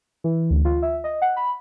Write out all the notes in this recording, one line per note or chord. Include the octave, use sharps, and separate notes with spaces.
E3
D2
F4
E5
D#5
F#5
B5